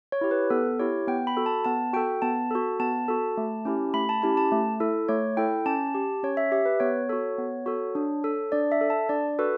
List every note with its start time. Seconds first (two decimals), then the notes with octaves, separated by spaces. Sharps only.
0.12 C#5
0.21 E4 G4
0.31 B4
0.50 B3 A4
0.79 E4 G4 C#5
1.07 B3 G5
1.27 B5
1.37 F#4 A4
1.46 A5
1.65 B3 A5
1.93 F#4 A4 G5
2.22 B3 A5
2.51 F#4 A4
2.80 B3 A5
3.08 F#4 A4
3.37 A3
3.65 C#4 E4 G4
3.94 A3 B5
4.09 A5
4.22 C#4 E4 G4 B5
4.37 A5
4.52 A3
4.80 E4 A4
5.09 A3 C#5
5.37 E4 A4 G5
5.65 C#4 A5
5.95 G4
6.23 C#4 C#5
6.37 E5
6.52 G4 E5
6.66 B4
6.80 B3 C#5
7.09 F#4 A4
7.38 B3
7.66 F#4 A4
7.95 D4
8.24 A4
8.52 D4 D5
8.72 E5
8.81 A4
8.90 A5
9.09 D4 D5
9.39 F#4 A4 B4